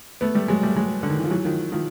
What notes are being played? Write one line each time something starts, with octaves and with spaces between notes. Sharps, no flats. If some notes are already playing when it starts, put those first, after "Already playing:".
A3 B3
G3 A3
F#3 G#3
G3 A3
F#3 G#3
D3
D#3
E3
F3
E3 F#3
D#3 F3
D#3 F3